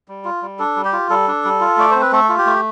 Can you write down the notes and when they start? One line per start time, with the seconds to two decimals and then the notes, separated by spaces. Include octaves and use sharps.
0.08 G3
0.25 F4
0.42 G3
0.59 D4 A4
0.76 G3
0.85 G4
0.93 F4
1.10 G3 A4
1.28 D4
1.45 G3
1.61 F4
1.78 A3 D5
1.91 C4 C5
2.01 B4
2.12 A3 A4
2.29 F4
2.38 G4
2.46 A3